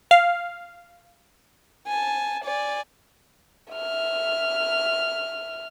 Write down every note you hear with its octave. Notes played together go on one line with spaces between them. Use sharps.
F5
G#5 A5
D5 G#5
E5 F6